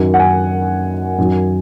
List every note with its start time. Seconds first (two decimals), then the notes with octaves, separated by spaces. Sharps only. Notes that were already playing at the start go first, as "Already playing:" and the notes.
Already playing: F#2 D#3 F#3
0.14 F#5
0.19 G#5
1.18 F#2 D#3 F#3